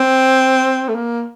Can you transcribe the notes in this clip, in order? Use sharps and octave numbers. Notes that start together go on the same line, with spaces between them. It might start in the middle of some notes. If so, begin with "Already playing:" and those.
Already playing: C4
A3
A#3